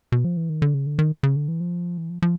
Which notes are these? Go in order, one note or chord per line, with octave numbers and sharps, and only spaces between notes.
B2
F3
E3
D#3
D3
C#3
D3
D#3
C#3
D3
E3
F3
E3
F3
F3